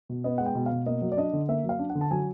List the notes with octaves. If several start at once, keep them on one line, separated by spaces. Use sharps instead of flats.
B2
B3 D#5
G#3 F#5
G5
B2
F5
B2
A#3 D#5
F#3
D5
D4 D#5
D3
A#3 E5
F#3
F5
D4
F#5
D3
A5
F#3 G#5